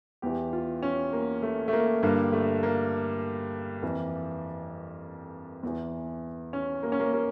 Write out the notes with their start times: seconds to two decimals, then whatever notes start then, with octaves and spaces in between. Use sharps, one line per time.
0.22 E2 E3 G4
0.53 F4
0.83 C#4
1.13 A#3
1.42 A3
1.68 A3
1.73 A#3
2.03 G2 D3 A#3
2.33 A3
2.63 A#3
3.83 F2 E3
5.63 E2 E3
6.53 C#4
6.83 A#3
6.92 C#4
7.00 A#3
7.13 A#3